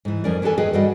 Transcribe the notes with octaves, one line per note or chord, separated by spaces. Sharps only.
G#2 E3
F2 F3 C#4 A#4 D5
E3 D4 G4 A4 G#5
D#3 G#4 B4 D#5 G5
G2 D3 G3 F#4 D#5 F#5